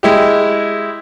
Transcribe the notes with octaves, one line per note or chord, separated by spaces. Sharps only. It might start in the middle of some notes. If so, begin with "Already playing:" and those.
G#3 E4 G4